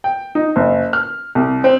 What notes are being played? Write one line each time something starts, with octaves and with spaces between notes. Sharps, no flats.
G5
D#4
F#1
F6
C2
C4